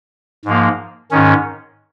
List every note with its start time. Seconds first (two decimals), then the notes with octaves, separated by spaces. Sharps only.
0.45 G#2 F3 A#3
1.11 G#2 D#3 C#4